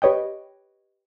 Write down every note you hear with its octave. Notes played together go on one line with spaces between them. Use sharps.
G4 B4 C#5 D#5 G5